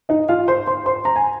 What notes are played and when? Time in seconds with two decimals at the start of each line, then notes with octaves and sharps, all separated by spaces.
0.09 D#4 D#5
0.29 F4 F5
0.48 C5 C6
0.67 C5 C6
0.86 C5 C6
1.05 A#5
1.16 G#5